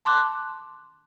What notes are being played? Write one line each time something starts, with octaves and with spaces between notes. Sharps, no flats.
A5 C6 D6 F#6